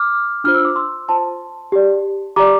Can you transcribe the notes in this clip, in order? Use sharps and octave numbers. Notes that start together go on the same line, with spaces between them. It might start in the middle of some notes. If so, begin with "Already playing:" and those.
Already playing: D6 F6
D4 F4 C5 F6
E6
D6
C6 E6
F4 C5 A5 C6
G4 D5
G4 D5 A#5 D6